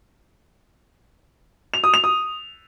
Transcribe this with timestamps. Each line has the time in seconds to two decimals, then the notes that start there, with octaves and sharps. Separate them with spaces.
1.74 F7
1.84 D#6
1.94 F7
2.04 D#6